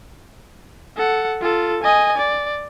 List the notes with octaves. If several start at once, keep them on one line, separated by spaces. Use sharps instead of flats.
A4 F#5
F4 A4
D#5 G#5
D5